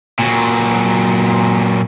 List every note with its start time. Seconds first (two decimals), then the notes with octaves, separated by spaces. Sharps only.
0.20 A#2 F#3